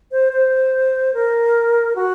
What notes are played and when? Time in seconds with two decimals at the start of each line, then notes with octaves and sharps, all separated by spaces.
0.12 C5
0.33 C5
1.14 A#4
1.96 F#4